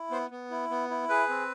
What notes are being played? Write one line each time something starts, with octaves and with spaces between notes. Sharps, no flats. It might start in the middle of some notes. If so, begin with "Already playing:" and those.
Already playing: E4
B3 C5
B3
E4
B3
E4
G#4 B4
C4